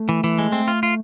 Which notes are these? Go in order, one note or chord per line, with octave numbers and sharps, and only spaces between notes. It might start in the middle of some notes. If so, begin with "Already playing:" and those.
Already playing: A3
E3
E3
G#3
C4
F4
F4